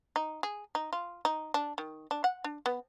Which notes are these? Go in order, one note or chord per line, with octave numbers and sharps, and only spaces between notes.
D#4
G#4
D#4
F4
D#4
D4
D#3
D4
F#5
D4
B3